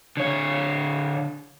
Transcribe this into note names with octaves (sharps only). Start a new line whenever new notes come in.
D3 C#5